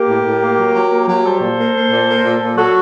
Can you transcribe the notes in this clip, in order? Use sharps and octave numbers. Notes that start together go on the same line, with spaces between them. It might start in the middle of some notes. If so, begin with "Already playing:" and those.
Already playing: A#3 G4 A#4
A2
A2
A#3
F#3
F#3
A#3
F#3
G3 A4 C5
A#2
A#3
A#3
A#2
A#3
A#2
A#2
F#3 F#4 A4